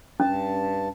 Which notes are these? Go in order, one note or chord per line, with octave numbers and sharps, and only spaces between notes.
G2 C#4 A5